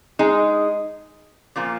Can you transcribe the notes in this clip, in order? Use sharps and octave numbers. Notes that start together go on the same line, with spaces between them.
G#3 D#4 G#4
A#2 F3 A#3 F4